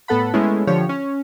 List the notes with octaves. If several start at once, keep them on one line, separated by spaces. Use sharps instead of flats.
A2 B3 A4 F#5 B5
G#3 A3 B3 C#4 E4
D3 F3 G4 C#5
C#4